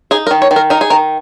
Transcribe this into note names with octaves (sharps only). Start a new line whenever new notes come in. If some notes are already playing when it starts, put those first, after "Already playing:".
D#4 G#4
A#4
D#3
C#5
D#3
A#4
D#4 A#4
G#4
D#3 A#4